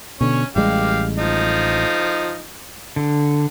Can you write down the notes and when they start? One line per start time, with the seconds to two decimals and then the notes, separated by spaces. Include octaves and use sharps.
0.21 B2 D3 C#4 C#5
0.56 A1 G3 G#3 G4 F5
1.18 F3 D#4
2.96 D3